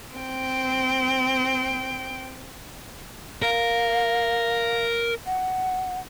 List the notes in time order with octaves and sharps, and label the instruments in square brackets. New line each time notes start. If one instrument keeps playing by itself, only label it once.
[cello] C4 G5
[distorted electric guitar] A#4 [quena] F5
[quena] F#5